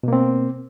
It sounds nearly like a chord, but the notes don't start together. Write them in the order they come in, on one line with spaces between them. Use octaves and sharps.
B2 A#3 C4